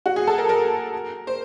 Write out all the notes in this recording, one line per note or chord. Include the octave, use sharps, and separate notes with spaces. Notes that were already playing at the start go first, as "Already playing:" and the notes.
F#4
G#4
A4
A#4
A#4
C5